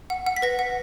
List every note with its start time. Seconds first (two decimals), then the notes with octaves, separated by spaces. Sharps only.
0.10 F#5
0.26 F#5
0.36 B6
0.42 B4 A#6
0.59 F#5